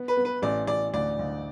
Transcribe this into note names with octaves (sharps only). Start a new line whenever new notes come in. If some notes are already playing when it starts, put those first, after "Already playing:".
Already playing: B3
B4
B3
B4
A1 D5
A1 D5
D2 D5
D2